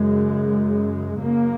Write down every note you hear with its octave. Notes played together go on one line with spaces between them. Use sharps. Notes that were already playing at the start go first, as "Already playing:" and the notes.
Already playing: F#2 C#3 G#3
F#2 C#3 A#3